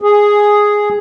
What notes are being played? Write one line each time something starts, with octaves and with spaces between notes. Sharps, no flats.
G#4